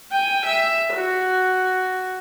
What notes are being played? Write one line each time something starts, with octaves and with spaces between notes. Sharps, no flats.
G5 G#5
E5
F#4